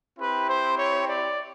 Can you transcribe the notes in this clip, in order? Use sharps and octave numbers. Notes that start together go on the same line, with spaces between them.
C4 E4 G4 B4
C5
C#5
D5